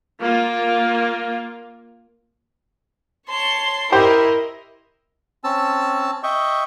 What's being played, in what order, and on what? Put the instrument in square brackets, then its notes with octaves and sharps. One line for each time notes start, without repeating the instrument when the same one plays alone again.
[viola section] A#3 F4
[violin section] C#5 A5 [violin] C6
[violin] E4 [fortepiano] G4 C5 [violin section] A#4 D#5
[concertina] C4 C#4 A5 E6
D#5 E5 G5 C#6